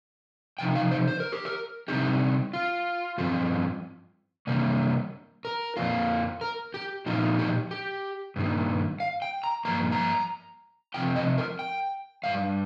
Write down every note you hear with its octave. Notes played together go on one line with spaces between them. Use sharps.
C3 F3 D#4 G5
F5
C5
C5
A#4
G4
A#4
C3 G3 C4 D#4 G4
F4
G2 F3 C4 F4
C3 G3 A#3
A#4
F2 F3 A#3 F4
A#4
G4
A#2 F3 D#4 F4
G4
G4
G2 D#3 A#3
F5
G5
A#5
G2 F3 A#3 A#5
A#5
C3 F3 C4 F4 G5
D#5
A#4
G5
G2 G3 F5